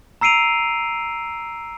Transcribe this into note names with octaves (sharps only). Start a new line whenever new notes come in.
A#5 E6 C7 D7 D#7 F7